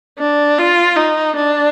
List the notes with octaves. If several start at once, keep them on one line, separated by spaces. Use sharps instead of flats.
D4
F4
D#4
D4